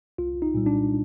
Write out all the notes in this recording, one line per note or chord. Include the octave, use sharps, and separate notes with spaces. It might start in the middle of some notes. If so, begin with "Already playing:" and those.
C2 F4
D#4
A#2 G3
D4